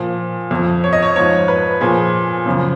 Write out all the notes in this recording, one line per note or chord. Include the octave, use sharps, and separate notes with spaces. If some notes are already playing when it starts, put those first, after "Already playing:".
Already playing: A#2 F3
F2 F3
C#5
D#5
C#5
G#2 F3 C#5
B4
A#2 F3 G#4
F#2 C#3 F3